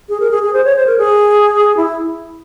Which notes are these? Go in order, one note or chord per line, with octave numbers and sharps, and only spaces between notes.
G#4
A#4
G#4
G#4
C5
C#5
C5
A#4
G#4
E4